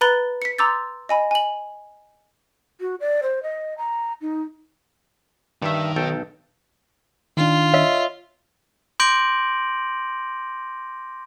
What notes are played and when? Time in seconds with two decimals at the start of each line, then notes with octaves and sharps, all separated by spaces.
0.01 B4 A#5 B5 F#6 A6 G7
0.42 B6 C#7
0.58 A#5 C6 D6 E6 G6 A6
1.09 D#5 G#5 B5
1.31 G#5 F#7
2.80 F#4
3.00 D5
3.23 C5
3.43 D#5
3.78 A#5
4.21 D#4
5.62 G2 D#3 E5
5.96 B1 A4 G5
7.37 D#3 D4 F4
7.74 C#5 D#5 E5
9.00 C6 D6 G6 A#6 D7 F#7